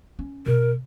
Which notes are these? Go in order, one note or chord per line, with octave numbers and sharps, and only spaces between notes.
C#4
B2 A#4